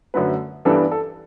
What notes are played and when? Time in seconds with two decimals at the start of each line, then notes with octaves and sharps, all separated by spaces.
0.14 F#2 D3 A3 B4
0.65 G2 E3 G3 B3 D4 A4
0.92 A4